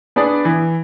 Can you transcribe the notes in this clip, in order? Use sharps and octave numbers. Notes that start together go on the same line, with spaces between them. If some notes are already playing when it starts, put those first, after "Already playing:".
B3 D4 G#4 D5
E3